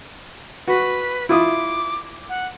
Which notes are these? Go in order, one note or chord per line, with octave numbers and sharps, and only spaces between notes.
F#4 B4
E4 F4 D6 D#6
F#5